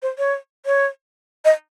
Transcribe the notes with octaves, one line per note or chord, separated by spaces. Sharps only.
C5
C#5
C#5
D#5